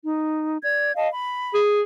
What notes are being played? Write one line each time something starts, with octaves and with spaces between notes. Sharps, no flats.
D#4
D5 G#6
D#5 F5 A5
B5
G#4